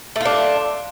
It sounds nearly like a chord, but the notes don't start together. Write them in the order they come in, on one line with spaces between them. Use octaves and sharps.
A3 F4 D4